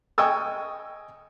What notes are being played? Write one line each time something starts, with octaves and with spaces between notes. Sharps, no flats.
D#5 G5 G#5 C#6 D#6 E6